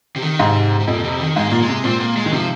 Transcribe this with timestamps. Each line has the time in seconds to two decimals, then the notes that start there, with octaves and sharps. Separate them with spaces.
0.16 C3
0.23 D#3
0.39 G#2 C3
0.80 C3
0.87 F2 A#2
1.04 C3
1.20 D#3
1.36 G#2 G#3
1.50 A#2 A#3
1.62 G#3
1.69 C3
1.84 A#2 C4
2.00 A#3
2.17 G#3
2.26 D#3
2.32 C3 F3